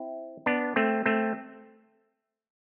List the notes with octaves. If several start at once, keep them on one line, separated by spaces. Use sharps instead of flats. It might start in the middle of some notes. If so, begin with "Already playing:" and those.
Already playing: C4 E4
B3 D4
A3 C4
A3 C4